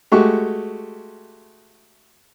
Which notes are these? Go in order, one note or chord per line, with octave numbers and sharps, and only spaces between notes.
G#3 A3 F#4 G4 C#6